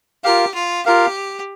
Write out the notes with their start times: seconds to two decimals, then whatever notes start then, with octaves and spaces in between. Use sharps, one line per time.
0.24 F4 G4 A#4 F5
0.54 F4
0.85 F4 G4 A#4 F5